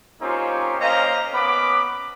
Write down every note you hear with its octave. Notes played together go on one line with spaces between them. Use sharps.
A#3 C4 C#4 D#4 F4 G4
A#3 C#4 C5 D#5 F5 A#5
B3 C#4 B5 D6